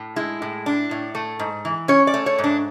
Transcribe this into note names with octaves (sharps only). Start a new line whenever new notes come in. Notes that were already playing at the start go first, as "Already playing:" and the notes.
Already playing: A2
G#3 E4
A2
D4
A2
A3
G#2
E3
C#4 C#5
D5
A3
C#5
G#2
D4